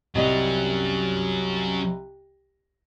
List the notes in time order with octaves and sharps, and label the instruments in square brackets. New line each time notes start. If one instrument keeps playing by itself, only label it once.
[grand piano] C2 D#5 [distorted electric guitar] F#3 C#4